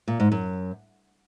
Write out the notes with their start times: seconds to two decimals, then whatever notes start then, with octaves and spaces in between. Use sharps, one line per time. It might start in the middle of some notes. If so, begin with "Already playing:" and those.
0.08 A#2
0.20 G#2
0.32 F#2